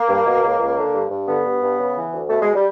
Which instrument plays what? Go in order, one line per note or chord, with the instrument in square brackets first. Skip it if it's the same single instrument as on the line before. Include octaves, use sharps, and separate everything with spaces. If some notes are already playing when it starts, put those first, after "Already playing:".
Already playing: [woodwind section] A#3
G2
B2
C#2
C#2
D3
G2
G2
D3 B3
G2
G2
C#3
E3
D2
B2 A3
G#3
G3